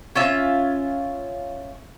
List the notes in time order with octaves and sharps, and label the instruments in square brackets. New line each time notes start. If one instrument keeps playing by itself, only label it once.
[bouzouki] C#4 F4 E5